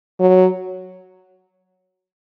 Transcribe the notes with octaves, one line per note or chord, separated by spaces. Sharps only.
F#3